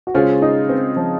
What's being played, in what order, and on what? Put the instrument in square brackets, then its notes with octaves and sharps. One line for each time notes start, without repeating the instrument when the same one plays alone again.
[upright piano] F#4
[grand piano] C#3 G#3 C#4 G#4 C5 [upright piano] F4
[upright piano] D#4
C4
F3